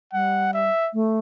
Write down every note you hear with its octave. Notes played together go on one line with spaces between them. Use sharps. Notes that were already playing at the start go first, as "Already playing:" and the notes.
G3 F#5
E5
A3